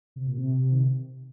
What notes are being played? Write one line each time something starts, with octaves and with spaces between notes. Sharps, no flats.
C3
A#2
C3
D#3